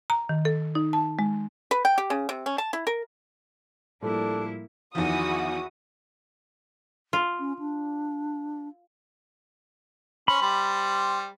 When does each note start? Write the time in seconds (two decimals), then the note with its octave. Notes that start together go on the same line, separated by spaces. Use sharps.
0.10 A#5
0.29 D#3
0.45 A4
0.75 D#4
0.93 A5
1.19 G#3
1.71 B4
1.85 G5
1.98 G4
2.10 C#3
2.29 C3
2.46 C#4
2.58 A5
2.73 E4
2.87 A#4
4.02 A2 F3 G3 A#3 D4 E4 A4
4.95 E2 D#3 F3 E4 F#4 D#6
7.13 F4
7.39 C#4
7.59 D4
10.28 C#4 C5 B5
10.42 G3 C5